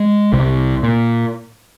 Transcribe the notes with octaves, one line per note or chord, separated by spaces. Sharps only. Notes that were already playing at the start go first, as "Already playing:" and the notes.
Already playing: G#3
C2 C3
A#2